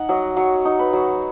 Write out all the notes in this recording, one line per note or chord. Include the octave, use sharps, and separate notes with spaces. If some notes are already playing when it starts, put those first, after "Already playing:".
Already playing: D#4 F#5
F#3 D#5
F#3 C#5
D#4
B4
F#3